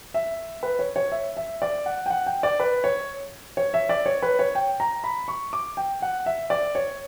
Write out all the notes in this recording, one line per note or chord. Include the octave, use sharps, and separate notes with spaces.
E5
B4
C#5
C#5
E5
E5
D5
F#5
G5
F#5
G5
D5
B4
C#5
C#5
E5
D5
C#5
B4
C#5
G5
A#5
B5
C#6
D6
G5
F#5
E5
D5
C#5